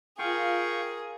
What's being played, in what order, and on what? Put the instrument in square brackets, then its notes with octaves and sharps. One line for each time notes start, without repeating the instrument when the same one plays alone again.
[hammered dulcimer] F4 [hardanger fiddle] G#4 A#4 [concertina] F5 G5 C#6